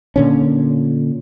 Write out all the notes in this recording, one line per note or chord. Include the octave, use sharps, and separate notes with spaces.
A#2 D3 C#4